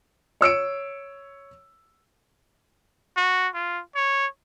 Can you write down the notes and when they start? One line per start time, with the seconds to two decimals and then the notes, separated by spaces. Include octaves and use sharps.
0.41 C#5 E6 C#7 D7
3.17 F#4
3.55 F4
3.96 C#5